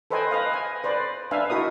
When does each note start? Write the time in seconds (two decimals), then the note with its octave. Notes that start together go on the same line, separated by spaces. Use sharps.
0.11 A4 B4 C5 D#5 G5 G#5
0.31 B4 D#5 F5
0.54 G#5
0.84 B4 C5 D5
1.31 D4 B4 E5 F5 G#5
1.50 D#4 E4 F#4 A#4 D#6